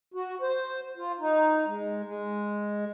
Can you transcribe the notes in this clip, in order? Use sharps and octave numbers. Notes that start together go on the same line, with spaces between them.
F#4
C5
F4
D#4
G#3
G#3